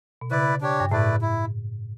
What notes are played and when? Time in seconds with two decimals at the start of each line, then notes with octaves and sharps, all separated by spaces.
0.21 B2
0.31 C#3 E4 B4 D5
0.61 D4 G4 C#5
0.80 G2
0.91 A2 A3 E4 B4 D5
1.21 E4